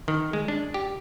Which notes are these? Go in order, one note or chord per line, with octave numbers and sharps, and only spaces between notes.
D#3
G#3
D4
G4